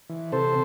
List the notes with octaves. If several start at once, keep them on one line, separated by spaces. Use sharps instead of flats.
E3
C3 A4 C5